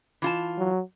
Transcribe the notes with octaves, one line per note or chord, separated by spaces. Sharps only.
E3 F4 A5
F#3